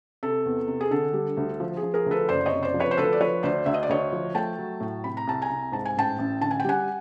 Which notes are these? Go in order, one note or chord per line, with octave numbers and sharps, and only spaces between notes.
C3 A4
E2
C3
G#4
D3 A4
G3
D2
F3
G#4
F3
G#4 A#4
D2
A4 B4
F#1 C5 D5
D5
C#5 D#5
C3
C5 D5
F3
B4 C#5
C5
D2 A4 B4
D5
F3 B4 C#5
D2 C5 D5
D2 E5
D#5
D5
D2 C#5 D#5
F3
A3 G5 A5
F#3
A2
C3 B5
A#5
C2 A5
G#5 A#5
C2
G#2 A5
G#5
A1 G5 A5
A1
D3 A5
G#5
G5
G3 F#5 G#5